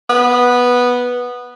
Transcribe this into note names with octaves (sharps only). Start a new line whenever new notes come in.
B3